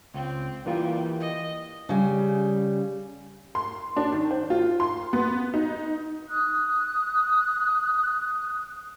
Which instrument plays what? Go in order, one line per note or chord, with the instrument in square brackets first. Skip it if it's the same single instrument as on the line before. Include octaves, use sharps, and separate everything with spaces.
[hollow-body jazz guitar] C#2 [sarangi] C4
[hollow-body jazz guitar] E3 A#3 F4 [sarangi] G3
[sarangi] D#5
[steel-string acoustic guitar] C#3 G3
[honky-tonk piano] C6
D4
D#3
C5
F4
C6
B3
D#4
[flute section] D#6 F#6